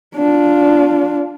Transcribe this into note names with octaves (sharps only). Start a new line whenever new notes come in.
D4 F4